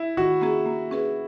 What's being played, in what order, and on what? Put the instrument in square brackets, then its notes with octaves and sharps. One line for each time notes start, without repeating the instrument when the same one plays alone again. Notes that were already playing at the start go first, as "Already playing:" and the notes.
Already playing: [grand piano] E4
[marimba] D#3 [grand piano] F#4
[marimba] A#3 C#4 G#4
A#3
C#4 G#4 B4